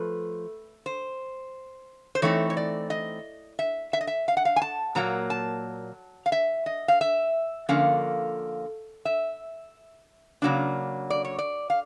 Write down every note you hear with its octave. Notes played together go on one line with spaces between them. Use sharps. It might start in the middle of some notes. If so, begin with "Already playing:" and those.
Already playing: F3 A3 B4
C5
C5
E3 A3 C4 D#4 C#5
C#5
D5
D#5
E5
E5
D#5
E5
F5
F#5
F5
G#5
A5
A#2 F#3 A#3 A#5
A5
F5
E5
D#5
F5
E5
D3 F3 A#3 C#4 F5
E5
C#3 F#3 A#3 D4
D5
C#5
D5
F5